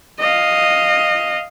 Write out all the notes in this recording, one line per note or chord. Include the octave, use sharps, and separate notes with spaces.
D#5 F5